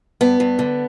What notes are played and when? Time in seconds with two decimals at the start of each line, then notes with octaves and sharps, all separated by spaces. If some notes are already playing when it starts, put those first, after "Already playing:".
0.21 G2 B3
0.40 G2
0.59 D3